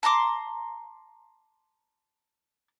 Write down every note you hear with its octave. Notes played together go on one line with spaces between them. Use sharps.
A5 A#5 C6 D6